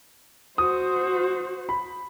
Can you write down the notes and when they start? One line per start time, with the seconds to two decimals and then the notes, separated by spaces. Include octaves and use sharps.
0.58 F#4 C5 D#6
1.69 B5